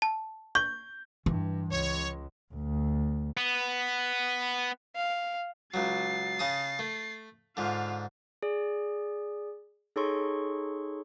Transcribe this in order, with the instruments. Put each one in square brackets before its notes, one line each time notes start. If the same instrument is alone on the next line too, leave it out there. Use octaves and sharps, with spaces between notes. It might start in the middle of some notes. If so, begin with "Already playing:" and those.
[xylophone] A5
[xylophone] C#6 [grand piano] G6
[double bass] G2 [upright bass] E3
[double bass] C#2 [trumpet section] C#5
[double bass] D2
[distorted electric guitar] B3
[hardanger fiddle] F5
[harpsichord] C#2 F#3 [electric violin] A6 C7
[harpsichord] C#3 A5 D#6
A3
[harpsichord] G#2 D3 [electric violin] F4 F5
[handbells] G#4 D5
D#4 G#4 A4 C#5 C6 C#6